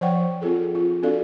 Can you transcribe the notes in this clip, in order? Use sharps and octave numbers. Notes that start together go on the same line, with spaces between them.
F3 C5 D5 F#5 G5 C#6
C4 F4 G#4 A4
F4
C4 D4 F#4 A4 D5 F5